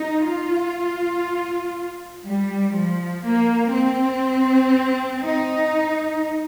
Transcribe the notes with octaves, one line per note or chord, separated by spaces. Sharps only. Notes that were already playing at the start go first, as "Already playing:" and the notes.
Already playing: D#4
F4
G3
F3
A#3
C4
D#4